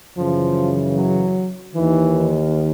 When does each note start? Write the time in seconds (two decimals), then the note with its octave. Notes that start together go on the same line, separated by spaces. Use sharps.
0.17 F#2 C#3 E3 F3
0.96 F#3
1.74 D#2 D#3 E3